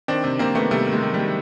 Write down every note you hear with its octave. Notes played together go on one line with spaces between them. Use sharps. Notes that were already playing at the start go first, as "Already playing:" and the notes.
D#3 C4 D4
C3
C3 A#3 C4
D#3 A3 B3
C3 G3 A3
D#3
G#3
D#3
G3
D#3